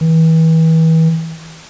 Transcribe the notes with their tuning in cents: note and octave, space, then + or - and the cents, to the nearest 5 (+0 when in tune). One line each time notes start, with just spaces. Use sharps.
E3 -35